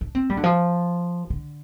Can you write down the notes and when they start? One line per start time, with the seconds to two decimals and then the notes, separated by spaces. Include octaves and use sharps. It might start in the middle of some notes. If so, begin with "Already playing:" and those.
0.01 D4
0.15 C4
0.30 G3
0.37 D3
0.44 F3
1.30 D3